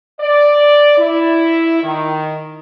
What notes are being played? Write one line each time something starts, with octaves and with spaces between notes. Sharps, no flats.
D5
E4
D#3